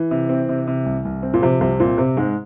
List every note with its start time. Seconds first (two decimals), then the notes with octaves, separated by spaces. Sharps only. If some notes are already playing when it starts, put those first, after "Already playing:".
Already playing: E3
0.11 C3
0.29 C4
0.49 C3
0.67 C3
0.86 C2
1.05 C2
1.23 C4
1.34 A#2
1.42 C3 F3
1.60 C2 C3
1.80 A#2 C4
1.98 C3 C4
2.17 G#2 G#3